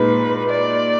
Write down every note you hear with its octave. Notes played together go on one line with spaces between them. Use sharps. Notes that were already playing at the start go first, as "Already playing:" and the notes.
Already playing: A#2 G#3 D#4 B4
D5